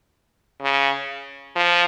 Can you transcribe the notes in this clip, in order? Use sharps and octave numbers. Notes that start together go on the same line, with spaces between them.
C#3
F3